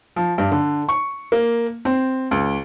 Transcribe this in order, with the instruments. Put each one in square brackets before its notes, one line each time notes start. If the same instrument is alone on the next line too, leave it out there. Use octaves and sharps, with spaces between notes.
[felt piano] F3
G2
D3
C#6
A#3
C4
C#2